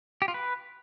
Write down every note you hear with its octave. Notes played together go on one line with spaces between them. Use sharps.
G4
F4
B4